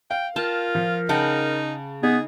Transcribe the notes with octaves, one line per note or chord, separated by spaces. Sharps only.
F5 G5
F4 A#4 G5 A5
F3
C#3 D#4 F#5 G5 A5
B3 D#4 G#4